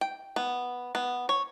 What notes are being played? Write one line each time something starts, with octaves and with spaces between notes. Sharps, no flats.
G5
B3
B3
C#5